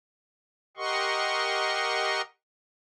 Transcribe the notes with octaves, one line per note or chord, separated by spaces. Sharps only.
G4 A#4 D#5 F#5 C6 C#6